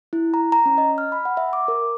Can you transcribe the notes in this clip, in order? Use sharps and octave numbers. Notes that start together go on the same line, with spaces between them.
E4
A#5
A#5
C#4
D#5
F6
B5
F#5
E5
D6
A#4